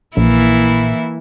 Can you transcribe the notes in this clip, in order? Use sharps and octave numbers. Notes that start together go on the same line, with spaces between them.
A#1 E3 A#3 E4